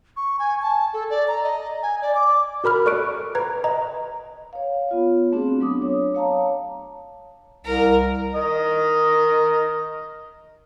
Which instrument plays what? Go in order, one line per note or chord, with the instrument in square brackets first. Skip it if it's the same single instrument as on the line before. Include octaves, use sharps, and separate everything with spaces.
[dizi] C#6
G#5
A5
A4
D5
A#5
D#5
G#5
D5
D6
[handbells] F#4 A#4 B5 F6
A4 D5 C#6 F#6 D7
B4 A#5 G#6
D#5 A#5
[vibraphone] C#5 F5
B3 F4 C#5
A3 C4 D4 F#4 G#4
F#3 B3 D4 D6 D#6
C#5
C#5 F5 A5 A#5
[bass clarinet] C2 [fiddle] A#4
[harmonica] A#4 D#5